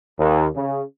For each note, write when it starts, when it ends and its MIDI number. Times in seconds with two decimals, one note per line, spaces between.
0.18 0.47 39
0.55 0.82 49